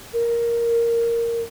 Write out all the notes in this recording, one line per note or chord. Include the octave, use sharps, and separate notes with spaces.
A#4